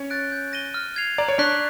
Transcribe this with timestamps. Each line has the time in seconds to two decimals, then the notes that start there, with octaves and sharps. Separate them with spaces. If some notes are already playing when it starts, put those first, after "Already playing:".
Already playing: C#4 C#5
0.10 F#6 A6 D7
0.32 G6
0.53 A#6 D#7 G7
0.74 F6
0.96 G#6 C7 F7
1.18 D5 A#5
1.28 C#5
1.38 D4 D5 C#6 F#6 B6